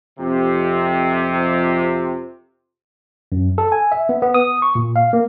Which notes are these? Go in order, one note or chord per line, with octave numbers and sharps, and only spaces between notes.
F2 C3
F#2
A4
G#5
E5
B3
B3
D#6
C#6
A#2
F5
A#3